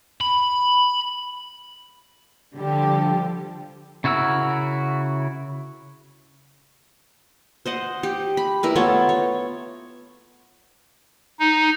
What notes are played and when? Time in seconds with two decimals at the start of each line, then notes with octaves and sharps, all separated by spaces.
0.21 B5
2.55 D3 F3 G3 G4
4.04 C#3 E4 F#4 A#4 E6
7.66 C5 D#5 F#5
8.03 G4
8.37 B5
8.63 E4 A#4 B4
8.75 A3 B3 F4 C#5
9.09 C#5
11.39 D#4